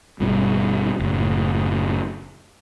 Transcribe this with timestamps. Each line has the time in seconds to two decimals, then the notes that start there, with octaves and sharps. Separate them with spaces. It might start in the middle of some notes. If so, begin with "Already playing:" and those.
0.20 G#1 G2 B2
0.99 F#1 A2